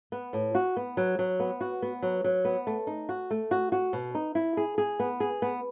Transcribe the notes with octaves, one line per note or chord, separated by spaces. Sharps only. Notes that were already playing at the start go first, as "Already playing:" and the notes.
B3
A2
F#4
B3
F#3
F#3
B3
F#4
B3
F#3
F#3
B3
A3
D#4
F#4
A3
F#4
F#4
B2
D#4
E4
G#4
G#4
B3
G#4
B3